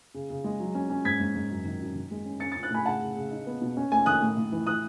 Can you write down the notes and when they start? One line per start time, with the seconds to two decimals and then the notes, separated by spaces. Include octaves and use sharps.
0.14 C#3
0.30 C#3
0.44 G#3
0.60 F#3
0.75 C#4
0.90 C#4
1.05 G#2 G#6 B6
1.20 G#2
1.35 G#2
1.50 F#2
1.65 D#3
1.80 F#2
1.95 D#3
2.11 G#3
2.26 C#4
2.40 C#4 A6 C#7
2.52 A6 C#7
2.56 C#4
2.63 F#6 A6
2.71 A2 G#5 B5
2.86 C#3 F#5 A5
3.01 C#3
3.16 C#3
3.31 D#4
3.47 B3
3.62 B2
3.77 C#4
3.92 A3 G#5
4.06 D#3 D#6 F#6
4.22 A2
4.37 A2
4.52 E3
4.67 E3 D#6 F#6